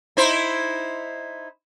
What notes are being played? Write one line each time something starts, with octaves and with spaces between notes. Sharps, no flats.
D#4 E4 C5